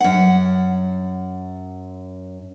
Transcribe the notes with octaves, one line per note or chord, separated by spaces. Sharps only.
F#2 F#5